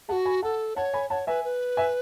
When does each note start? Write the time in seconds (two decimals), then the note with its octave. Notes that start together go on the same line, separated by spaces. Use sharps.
0.08 G#4 F#5 A5
0.12 F#4
0.25 G#5 B5
0.42 A4 F#5 A5
0.76 C#5 F#5 A5
0.94 G#5 B5
1.10 C#5 F#5 A5
1.27 B4 E5 G#5
1.44 B4
1.77 E5 G#5